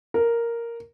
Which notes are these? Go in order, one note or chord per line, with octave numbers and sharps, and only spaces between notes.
A#4